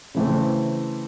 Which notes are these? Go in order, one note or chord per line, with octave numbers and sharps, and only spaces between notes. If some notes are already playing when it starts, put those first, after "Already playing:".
C#3 E3 A3 C4